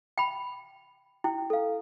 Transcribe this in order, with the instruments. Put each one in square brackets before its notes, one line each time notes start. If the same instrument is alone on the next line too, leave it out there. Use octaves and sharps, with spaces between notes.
[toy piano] G5 B5
[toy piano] E4 [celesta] G5
[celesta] A4 F5